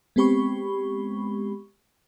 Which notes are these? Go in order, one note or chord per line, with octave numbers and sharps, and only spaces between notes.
G#3 B3 C4 G4 B5 C#6